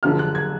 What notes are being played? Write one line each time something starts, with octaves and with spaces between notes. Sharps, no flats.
F#1 F#2 D3 F3 F6
F#6
G#6